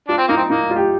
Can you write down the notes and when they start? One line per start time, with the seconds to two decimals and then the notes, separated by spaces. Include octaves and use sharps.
0.08 D4 F4
0.17 C4
0.28 A#3 D#4
0.37 C4
0.49 A#3 D#4
0.71 F4
0.76 G4